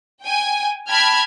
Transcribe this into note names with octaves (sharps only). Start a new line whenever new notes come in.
G5 G#5
G5 A5 B5 F6 G#6